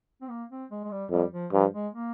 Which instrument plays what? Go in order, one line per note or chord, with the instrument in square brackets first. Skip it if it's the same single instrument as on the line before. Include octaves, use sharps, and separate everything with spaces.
[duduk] C4
A#3
C4
G#3
G#3
G3
[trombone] F2 [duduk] G3
[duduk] F3
[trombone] G2 [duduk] F3
[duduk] G#3
A#3